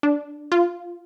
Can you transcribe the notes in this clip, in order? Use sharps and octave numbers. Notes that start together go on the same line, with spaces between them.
D4
F4